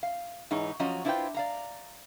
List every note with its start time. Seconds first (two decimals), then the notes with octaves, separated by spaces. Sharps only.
0.03 F5
0.51 G#2 E3 D#4 G#4 C#5 A#5
0.80 F3 F#3 C#4 D#5 A#5
1.05 D4 E4 F4 B4 C5 G5
1.34 D5 F5 A#5